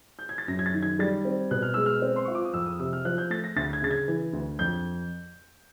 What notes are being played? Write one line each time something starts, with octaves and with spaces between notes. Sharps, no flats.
G6
G#6
A6
F#2 A#6
G#6
A6
D#3
G#6
G3 A6
C4
B2 F#6
F6
G#3 E6
F6
C4
C6
F4 C#6
D6
D#6
F2 E6
D#6
C3 E6
F6
F3 F#6
G6
A3 A6
A#6
D2 A6
G#6
C#3 A6
G#6
E3
D2
F2 G6